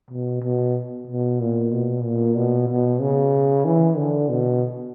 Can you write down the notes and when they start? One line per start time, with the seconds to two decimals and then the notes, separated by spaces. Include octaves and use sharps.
0.11 B2
0.43 B2
1.07 B2
1.40 A#2
1.72 B2
2.04 A#2
2.36 B2
2.68 B2
3.01 C#3
3.65 E3
3.97 D3
4.29 B2